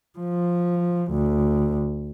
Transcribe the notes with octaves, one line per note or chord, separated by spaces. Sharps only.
F3
D2